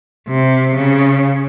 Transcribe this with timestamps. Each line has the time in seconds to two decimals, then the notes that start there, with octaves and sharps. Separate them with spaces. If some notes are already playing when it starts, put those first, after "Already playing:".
0.28 C3
0.76 C#3